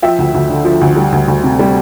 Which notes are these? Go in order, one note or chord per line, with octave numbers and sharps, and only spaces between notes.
F3 E5 G5
D2
D2
D3
F3
D2
G3
D2
D2
C3
G3